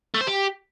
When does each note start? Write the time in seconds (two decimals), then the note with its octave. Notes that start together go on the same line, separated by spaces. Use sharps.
0.14 A3
0.21 C5
0.27 G4